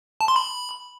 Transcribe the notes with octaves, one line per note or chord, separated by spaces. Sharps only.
A5
C6
B5